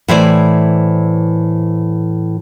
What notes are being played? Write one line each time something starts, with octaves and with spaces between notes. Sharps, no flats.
A2 E3 C5 D5